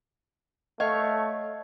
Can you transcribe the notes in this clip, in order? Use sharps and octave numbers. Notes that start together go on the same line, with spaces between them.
A3 C#5 D#5 F5 C#6